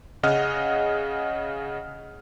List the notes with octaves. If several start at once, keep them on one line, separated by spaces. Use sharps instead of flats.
C#3 G#4 D#5 F#5 F6